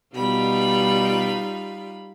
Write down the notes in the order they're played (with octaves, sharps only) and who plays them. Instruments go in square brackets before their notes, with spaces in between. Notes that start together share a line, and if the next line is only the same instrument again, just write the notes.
[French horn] B2 [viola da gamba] G3 D#4 F4 [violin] B5